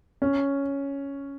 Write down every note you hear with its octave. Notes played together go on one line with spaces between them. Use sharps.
C#4